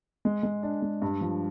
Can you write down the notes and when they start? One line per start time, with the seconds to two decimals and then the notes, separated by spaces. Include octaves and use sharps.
0.25 G#3
0.43 G#3
0.63 D4
0.82 G#3
1.02 G2
1.21 F3